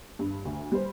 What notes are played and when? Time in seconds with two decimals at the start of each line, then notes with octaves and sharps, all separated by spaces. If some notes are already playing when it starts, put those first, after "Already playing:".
0.19 G2
0.45 D2
0.72 G3 C5